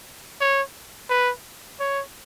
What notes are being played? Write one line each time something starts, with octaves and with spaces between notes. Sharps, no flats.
C#5
B4
C#5